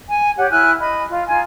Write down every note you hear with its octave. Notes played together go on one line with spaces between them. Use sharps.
G#5
G4 C#5 F#5
E4 G#5 F6 F#6
D#5 B5
F4
D#4 F4 G#5